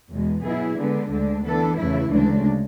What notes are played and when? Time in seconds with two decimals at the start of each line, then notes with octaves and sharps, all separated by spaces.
0.10 E2 B2 G#3
0.43 B2 F#3 B3 E4 G#4
0.77 D3 G#3 B3 D4
1.11 D2 D3 G#3 D4
1.44 E3 B3 D4 A4
1.78 E2 C#3 E3 A3 E4
2.11 D2 C#3 G#3 D4